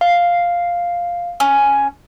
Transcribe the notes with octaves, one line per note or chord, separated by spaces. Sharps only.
F5
C#4